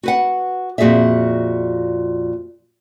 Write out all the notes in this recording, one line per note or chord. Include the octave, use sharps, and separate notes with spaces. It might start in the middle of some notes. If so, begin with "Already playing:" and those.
F#4 B4 F#5
F2 A#2 F#4 G#4 D5 E5